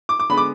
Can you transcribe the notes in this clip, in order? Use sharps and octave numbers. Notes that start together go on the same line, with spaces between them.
D6
D6
D3 G#3 B3 B5
D6